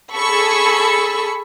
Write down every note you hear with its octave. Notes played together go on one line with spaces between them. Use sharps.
G#4 A4 A5 B5 C#6 E6